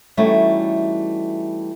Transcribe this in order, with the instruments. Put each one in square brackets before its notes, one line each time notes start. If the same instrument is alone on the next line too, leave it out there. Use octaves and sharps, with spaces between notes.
[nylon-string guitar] E3 G3 A3 C#4 D#4 F#4